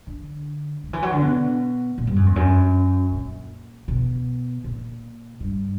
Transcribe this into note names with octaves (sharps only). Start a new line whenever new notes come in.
D3
D3
E3
F#3
D3
B2
A#2
G2
F#2
E2
F#2
A#2
B2
A#2
G2